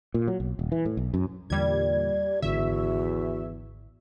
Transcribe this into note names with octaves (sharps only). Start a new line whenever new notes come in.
A#2
F#3
B1
D#1
E3
A2
B1
F#2
E2 A#2 D3 G3 D5 G#6
G#1 E2 D3 F#4 E5